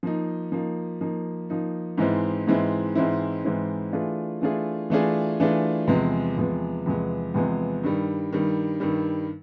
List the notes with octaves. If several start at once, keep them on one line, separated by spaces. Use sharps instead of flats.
F3 A#3 D#4
F3 A#3 D#4
F3 A#3 D#4
F3 A#3 D#4
G#2 E3 G#3 C4 E4
G#2 E3 G#3 C4 E4
G#2 E3 G#3 C4 E4
G#2 E3 G#3 C4 E4
E3 A3 D4 F4 G#4
E3 A3 D4 F4 G#4
E3 A3 D4 F4 G#4
E3 A3 D4 F4 G#4
E2 C3 F3 G#3 B3
E2 C3 F3 G#3 B3
E2 C3 F3 G#3 B3
E2 C3 F3 G#3 B3
G2 D#3 G3
G2 D#3 G3
G2 D#3 G3